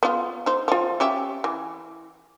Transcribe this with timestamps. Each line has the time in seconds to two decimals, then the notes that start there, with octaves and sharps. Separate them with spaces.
0.03 B3 F4
0.46 D#4 C5
0.68 F3 F4
1.00 C#4 G4 E5
1.44 E3